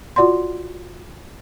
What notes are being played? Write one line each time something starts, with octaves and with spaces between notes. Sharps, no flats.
F4 F#4 D5 F#5 C6